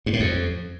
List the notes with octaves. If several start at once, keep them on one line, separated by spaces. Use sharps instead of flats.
G2
A2
F2